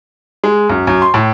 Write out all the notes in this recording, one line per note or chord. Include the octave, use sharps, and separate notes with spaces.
G#3
F#2
F#2
C6
A2